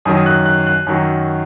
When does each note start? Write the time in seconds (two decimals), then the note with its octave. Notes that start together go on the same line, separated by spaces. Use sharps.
0.05 F#2 D#3 F#3 D#6
0.26 F#6
0.46 F#6
0.67 F#6
0.87 F#2 D#3 F#3